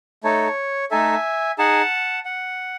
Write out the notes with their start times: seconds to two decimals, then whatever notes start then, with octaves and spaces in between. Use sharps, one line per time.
0.24 A3 D#4 A4 C#5
0.91 A3 D#4 A4 E5 G#5
1.58 D#4 G#4 F#5 A5
2.25 F#5